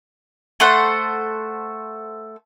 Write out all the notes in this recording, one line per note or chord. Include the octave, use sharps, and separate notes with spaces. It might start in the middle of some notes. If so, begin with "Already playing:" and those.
A3 A4 C5 F#5